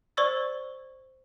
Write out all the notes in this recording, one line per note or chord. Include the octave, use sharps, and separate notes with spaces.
C5 D5 C#6 E6 A6